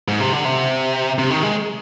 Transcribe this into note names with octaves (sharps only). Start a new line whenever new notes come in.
G#2
C3
D3
C3
C3
D#3
G#3